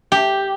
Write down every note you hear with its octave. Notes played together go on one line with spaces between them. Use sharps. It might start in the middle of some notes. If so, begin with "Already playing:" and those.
G4